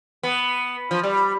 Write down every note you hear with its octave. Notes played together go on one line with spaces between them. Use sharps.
B3
F3
G3